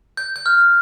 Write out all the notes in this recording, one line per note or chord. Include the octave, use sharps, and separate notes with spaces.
G6
G6
F6